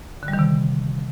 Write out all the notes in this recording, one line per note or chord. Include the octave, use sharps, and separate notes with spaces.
D3
G3
D#3
C3